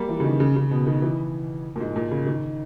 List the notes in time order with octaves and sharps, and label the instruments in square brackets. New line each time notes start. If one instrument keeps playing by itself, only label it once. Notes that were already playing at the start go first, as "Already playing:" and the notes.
Already playing: [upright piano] G3 A#3
E3
C#3
D#3
C#3
C#3
B2
D#3
E3
A#2
G#2
A#2
C#3
D#3